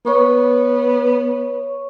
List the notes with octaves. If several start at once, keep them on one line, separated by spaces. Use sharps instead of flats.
B3 C#5 C#6